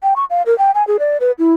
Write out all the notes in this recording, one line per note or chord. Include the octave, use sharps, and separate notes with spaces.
G5
C#6
F5
A#4
G5
G#5
G#4
D5
B4
E4